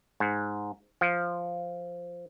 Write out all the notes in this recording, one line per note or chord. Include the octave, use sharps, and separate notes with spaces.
G#2
F3